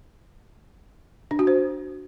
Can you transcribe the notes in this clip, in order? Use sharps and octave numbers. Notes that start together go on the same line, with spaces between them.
D4
F#4
C5